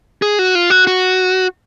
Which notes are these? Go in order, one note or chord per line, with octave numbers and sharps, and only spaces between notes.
G#4
F#4
F4
F#4
F#4